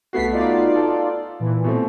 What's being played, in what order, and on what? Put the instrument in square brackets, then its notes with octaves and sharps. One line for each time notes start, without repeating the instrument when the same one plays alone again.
[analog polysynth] C2 B6 C7 [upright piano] A3 B3 F#4
[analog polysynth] D#4 F4 D5
[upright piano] A4
[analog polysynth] A#2 E3
[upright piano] B2 A3 C4